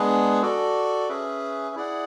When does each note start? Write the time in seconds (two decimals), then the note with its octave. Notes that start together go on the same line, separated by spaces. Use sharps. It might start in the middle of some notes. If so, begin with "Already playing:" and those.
Already playing: G#3 B3 D4 G#4 B4
0.42 F#4 A4 D5
1.09 C#4 G#4 B4 E5
1.76 E4 G#4 D5 F#5